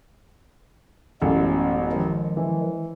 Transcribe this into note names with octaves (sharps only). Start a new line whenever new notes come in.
A1 F#2 A2 G#3 B3
D#3 F3 G#3
E3